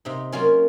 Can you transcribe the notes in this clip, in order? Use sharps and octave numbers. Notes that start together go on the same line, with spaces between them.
C3 D#4
F#3 A#3 C#4 F4